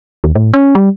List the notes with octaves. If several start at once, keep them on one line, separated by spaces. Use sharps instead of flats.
D#2
A2
C#4
G3